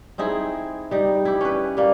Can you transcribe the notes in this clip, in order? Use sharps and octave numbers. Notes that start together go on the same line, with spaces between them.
C4 D#4 E4 G#4
G3 D#4
E4 G4
C#4 B4
G3 A#3